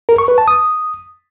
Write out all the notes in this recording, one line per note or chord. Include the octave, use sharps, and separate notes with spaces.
A#4
C#6
B4
A5
D#6